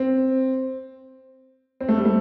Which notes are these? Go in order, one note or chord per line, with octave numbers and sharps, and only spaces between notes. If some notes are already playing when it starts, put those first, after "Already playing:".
Already playing: C4
C4
A3
G3
A3